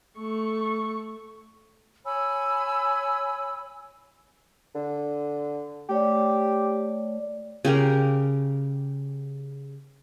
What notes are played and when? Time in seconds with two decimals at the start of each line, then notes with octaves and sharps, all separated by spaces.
0.18 A3 C#6
2.05 C#5 G#5 B5 E6
4.75 D3
5.89 A3 G4 C#5 D5
7.65 C#3 G4 A#4